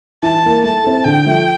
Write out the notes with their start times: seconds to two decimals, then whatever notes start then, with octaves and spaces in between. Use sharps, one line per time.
0.23 E3 A5
0.43 A#3 E4
0.64 A3 A5
0.84 C4 E4 A4
1.05 D3 G5
1.25 F3 A3